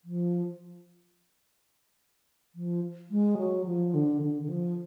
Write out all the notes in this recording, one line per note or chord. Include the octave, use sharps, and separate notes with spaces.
F3
F3
G#3
F#3
F3
D3
D3
D3
F3